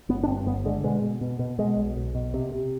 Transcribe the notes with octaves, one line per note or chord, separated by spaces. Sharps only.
G1 B3
D4
G2 C4
G1 B3
D3 G#3
B2 G#3
B2
B2
B2
B2 G#3
B1
B1
B2
C3
C3